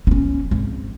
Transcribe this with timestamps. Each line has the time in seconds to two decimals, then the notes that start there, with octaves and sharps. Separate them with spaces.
0.07 C4 C#4
0.51 G#1